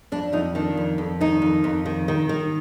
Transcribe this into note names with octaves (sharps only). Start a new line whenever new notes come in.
F2 D4
F2 D#4
D#3 D4
F2
F2
D#3 D#4
F2
F2
D#3
D#3
D#3